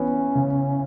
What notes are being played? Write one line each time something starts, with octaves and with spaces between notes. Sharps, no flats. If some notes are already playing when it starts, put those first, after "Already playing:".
Already playing: E3 B3 C#4
C#3